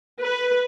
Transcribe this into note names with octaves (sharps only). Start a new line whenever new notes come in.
B4